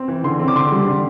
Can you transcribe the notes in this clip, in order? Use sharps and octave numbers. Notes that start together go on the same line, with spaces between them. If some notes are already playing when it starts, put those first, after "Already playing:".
Already playing: C4
E3
D3 C6
C4
D6
D3 C6
G3
D3